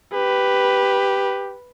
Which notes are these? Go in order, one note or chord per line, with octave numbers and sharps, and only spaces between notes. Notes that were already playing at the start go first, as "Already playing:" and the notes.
G4 B4